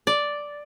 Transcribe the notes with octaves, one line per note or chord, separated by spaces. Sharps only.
D5